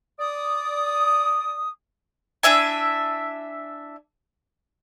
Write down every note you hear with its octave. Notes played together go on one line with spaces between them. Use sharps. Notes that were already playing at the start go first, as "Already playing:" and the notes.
D5 D#6
D4 E4 E5 G#5